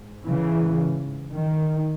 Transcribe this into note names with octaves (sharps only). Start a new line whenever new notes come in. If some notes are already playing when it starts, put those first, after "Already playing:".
Already playing: G#2
C#3 E3
D#3